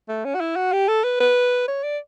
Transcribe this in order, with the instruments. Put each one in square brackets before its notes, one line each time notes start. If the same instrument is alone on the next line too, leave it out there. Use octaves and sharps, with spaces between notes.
[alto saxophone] A3
C#4
F#4
E4
F#4
G4
A4
B4
B4
C#5
D5